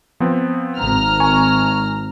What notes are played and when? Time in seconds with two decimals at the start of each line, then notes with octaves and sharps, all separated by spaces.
0.20 F3 B3 C4
0.77 G#1 A#5 F6
1.20 G#5 C#6